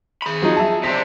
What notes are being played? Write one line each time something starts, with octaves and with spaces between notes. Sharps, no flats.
G#4 B5
F3 F#3 D#4
E5 A5
C3 D4 B6